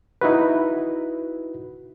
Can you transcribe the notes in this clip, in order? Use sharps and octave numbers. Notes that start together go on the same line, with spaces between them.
D#4 E4 F#4 B4